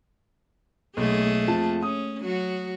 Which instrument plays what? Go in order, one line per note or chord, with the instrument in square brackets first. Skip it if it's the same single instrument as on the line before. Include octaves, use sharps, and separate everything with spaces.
[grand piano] B1 [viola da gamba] A3 A#3 G#4
[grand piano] F2 F3 A5
[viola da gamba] C#4 [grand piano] D#6
[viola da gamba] F#3 F#4